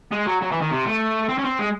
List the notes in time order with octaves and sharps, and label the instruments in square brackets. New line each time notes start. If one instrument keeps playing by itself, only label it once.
[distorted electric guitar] G#3
F#3
F#3
E3
D#3
C3
A3
C4
C#4
C4
G#3